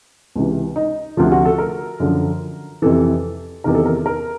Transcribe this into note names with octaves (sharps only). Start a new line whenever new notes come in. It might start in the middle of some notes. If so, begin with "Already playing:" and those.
C#2 C3 E3
D#4
D2 C3 F3 F4
F#4
A4
A#4
F#2 D3 F3
F2 C3 E3 A4
E2 C3 D#3 A#4
A4
A#4
A#4